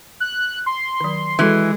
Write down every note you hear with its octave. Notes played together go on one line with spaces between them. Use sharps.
F#6
C6
D#3 F#3
E3 G#3 F#4 A4